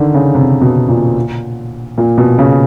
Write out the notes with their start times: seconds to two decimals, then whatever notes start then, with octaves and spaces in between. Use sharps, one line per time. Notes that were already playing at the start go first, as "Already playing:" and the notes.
Already playing: D3 D#3
0.14 C#3
0.35 C3
0.61 B2
0.89 A#2
1.98 A#2
2.18 B2
2.39 C#3